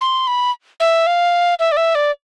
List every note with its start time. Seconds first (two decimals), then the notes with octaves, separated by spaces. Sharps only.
0.01 C6
0.27 B5
0.80 E5
1.07 F5
1.59 E5
1.72 D5
1.77 E5
1.95 D5